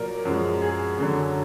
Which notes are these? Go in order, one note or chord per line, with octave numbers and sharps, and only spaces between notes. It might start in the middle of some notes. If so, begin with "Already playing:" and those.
Already playing: A#2 F#3 A#4 D5
F#2 F3 G#3
G#4
F#2 D3 F#3